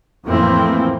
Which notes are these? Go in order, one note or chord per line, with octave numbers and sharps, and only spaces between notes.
F2 A2 E3 A#3 C4